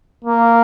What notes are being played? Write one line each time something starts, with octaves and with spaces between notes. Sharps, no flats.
A#3